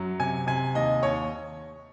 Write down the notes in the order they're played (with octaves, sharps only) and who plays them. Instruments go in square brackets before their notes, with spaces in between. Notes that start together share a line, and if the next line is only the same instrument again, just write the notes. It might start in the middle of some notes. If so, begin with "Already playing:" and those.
Already playing: [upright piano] F#2 F#3
C3 G#5
C3 G#5
D#2 D#5
D#2 C#5